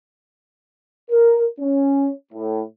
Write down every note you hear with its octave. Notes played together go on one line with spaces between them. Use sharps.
A#4
C#4
A2